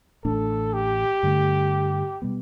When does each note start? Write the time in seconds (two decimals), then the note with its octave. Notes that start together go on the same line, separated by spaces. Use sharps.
0.25 A1 A2 A3 D4 A4
0.74 G4
1.23 G2 D3 A3
2.22 B2 G3 B3